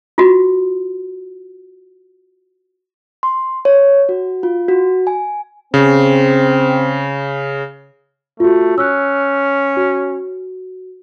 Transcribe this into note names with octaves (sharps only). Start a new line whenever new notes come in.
F4 F#4
C6
C#5
F#4
F4
F#4
G#5
C#3 C4
A3 F4 F#4
C#4 E6 F#6
F#4